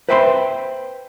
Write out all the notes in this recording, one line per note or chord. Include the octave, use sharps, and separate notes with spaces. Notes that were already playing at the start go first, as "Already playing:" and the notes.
B4 C5 E5 G5 B5 C6